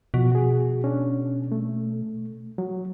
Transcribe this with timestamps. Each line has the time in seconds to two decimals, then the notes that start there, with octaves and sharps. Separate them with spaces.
0.14 B2 F3 F#4
0.32 F#4 G#4
0.84 C#4 D4
1.52 A3
2.58 F#3